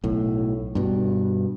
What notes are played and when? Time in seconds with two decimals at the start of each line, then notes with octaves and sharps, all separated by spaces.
0.04 B1 A2
0.75 G2 B2